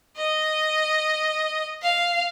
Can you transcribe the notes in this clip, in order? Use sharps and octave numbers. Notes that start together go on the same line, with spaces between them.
D#5
F5